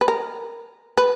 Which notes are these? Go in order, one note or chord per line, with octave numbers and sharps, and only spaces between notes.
B4
A#4
B4